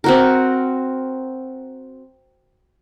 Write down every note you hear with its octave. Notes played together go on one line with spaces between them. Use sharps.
C4 F#4 A#4